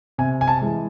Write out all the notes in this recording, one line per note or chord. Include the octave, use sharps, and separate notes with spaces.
C3 G#5
G#5
A5
E3 G#3